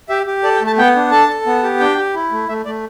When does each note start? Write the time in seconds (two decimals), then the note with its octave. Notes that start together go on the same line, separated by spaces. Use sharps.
0.09 G4 E5
0.26 G4
0.43 A4 D5
0.55 G5
0.61 A3
0.67 A5
0.78 B3 G5
0.96 D4
1.11 A4 A5
1.29 A4
1.46 B3
1.63 G4
1.80 D4 G5
1.98 G4
2.15 E4
2.31 A3
2.48 A3 E5
2.65 A3 D5